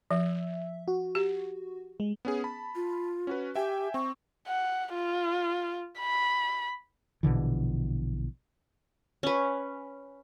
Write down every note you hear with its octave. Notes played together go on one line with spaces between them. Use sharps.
F3 E5
F#4
G4
G#3
B3 C#4 G#4
A5 B5
F4
C#4 F#4 B4
G4 E5 G5 G#5
C4 C#6
F#5
F4
B5
A#1 B2 D3 E3
C#4 B4